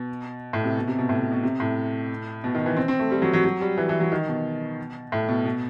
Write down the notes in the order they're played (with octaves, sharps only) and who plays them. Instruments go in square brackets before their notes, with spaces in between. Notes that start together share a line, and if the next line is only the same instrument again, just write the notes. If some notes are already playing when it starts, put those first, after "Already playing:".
Already playing: [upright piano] B2
A2
C3
B2
C3
B2
A2
B2
B2
C3
A2
B2
D#3
E3
C4
C4
A3
G3
F#3
F#3
F#3
G3
E3
E3
F#3
D#3
B2
A2
B2
B2